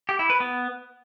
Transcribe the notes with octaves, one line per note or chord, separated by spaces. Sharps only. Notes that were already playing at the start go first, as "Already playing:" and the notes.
G4
E4
B4
B3